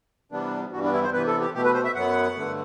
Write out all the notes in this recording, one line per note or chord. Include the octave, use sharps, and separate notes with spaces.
C3 E3 G3 B3 D4
G2 E3 G3 B3 F#4
D4
E4
C5
C3 E3 B3 B4
A4
G4
B2 A3 G4
B4
C5
E5
F#2 F#3 B3 F#5
G2 D3 A3